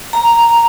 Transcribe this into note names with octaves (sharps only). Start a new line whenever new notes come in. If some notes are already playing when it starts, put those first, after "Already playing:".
A#5